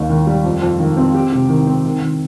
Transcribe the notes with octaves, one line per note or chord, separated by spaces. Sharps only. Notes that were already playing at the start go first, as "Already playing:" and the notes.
Already playing: D#2 D#4
D#3
G3
F2
F2
D#3
C4
G4
C3
D#3
C4
D#3
D#3